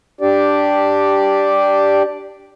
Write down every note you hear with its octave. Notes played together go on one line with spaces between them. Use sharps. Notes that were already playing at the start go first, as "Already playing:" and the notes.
D4 G4 D5